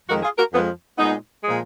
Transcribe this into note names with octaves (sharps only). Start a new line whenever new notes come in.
F2 D#3 G#3 F#4 A#4
F4 G#4
F#4 A#4
F2 F3 G#3 B3
A#2 G#3 B3 D#4
A#2 F3 G#3 G#4